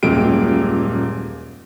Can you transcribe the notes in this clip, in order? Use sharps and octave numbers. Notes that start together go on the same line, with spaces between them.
D#1 F#2 A#2 G#3 G4 D7